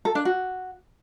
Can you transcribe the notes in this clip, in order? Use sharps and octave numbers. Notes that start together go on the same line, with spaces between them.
A4
D4
F#4